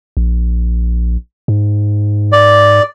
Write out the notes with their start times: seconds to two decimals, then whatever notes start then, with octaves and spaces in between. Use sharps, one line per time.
0.17 A#1
1.48 G#2
2.32 D5